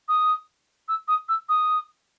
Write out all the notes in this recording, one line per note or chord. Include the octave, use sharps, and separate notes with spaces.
D#6
E6
D#6
E6
D#6